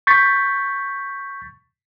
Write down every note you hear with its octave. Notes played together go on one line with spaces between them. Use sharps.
C#6 G6 A6 B6